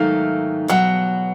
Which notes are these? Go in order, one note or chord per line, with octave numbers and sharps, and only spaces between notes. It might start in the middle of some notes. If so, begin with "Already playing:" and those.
Already playing: G#2 D#3 F#3 A3 F5
E2 B2 F#3 F#5